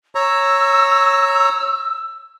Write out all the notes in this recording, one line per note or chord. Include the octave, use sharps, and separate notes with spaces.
C#5 A#5 E6